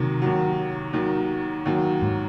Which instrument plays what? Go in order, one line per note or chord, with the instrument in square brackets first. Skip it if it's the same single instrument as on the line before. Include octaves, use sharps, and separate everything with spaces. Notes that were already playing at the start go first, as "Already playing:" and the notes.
Already playing: [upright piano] D#2 D#3 F#3 [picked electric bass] C3
[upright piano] D#2 D#3 F#3
D#2 D#3 F#3
D#2 D#3 F#3
[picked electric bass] G#2